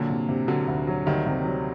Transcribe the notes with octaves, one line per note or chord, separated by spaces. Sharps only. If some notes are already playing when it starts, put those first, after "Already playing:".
Already playing: A#2 D3 F#3
C3
C3
D3 F#3 A#3
D2
F#3
D2 D#3 G3
C3
F#3